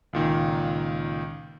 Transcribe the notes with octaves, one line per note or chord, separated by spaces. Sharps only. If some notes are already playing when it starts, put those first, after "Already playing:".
C#2 A#2 D#3